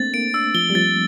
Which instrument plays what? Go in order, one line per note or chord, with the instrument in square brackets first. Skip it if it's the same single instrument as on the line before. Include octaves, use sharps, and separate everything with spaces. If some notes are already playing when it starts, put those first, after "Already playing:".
Already playing: [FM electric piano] A3 A#3 C4 D4 [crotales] A6
[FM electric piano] A#3 [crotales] D7
[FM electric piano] D4 [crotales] E6
[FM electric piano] F3 [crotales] G7
[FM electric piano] G3
[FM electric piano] F3 [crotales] A6